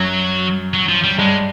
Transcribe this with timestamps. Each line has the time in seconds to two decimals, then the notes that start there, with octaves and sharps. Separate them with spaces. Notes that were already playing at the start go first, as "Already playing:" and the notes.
Already playing: F#2 F#3
0.74 F#3
0.89 F3
1.04 G3
1.18 G2 G#3